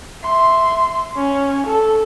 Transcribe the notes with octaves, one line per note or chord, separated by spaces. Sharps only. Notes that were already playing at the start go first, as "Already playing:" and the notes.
E5 C6
C#4
A4